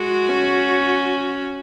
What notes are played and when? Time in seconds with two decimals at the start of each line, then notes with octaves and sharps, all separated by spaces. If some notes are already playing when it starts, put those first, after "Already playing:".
Already playing: G#3 F#4
0.29 C#4